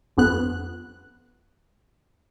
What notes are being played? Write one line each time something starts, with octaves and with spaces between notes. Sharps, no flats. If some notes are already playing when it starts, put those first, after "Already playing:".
G1 F2 B3 F#6